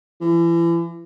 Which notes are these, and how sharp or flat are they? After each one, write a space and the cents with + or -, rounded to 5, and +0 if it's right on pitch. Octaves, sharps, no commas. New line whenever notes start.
E3 +35